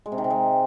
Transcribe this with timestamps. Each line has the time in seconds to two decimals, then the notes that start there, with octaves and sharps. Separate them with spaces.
0.06 G#3
0.12 C3
0.18 D#3
0.24 C3
0.30 G#3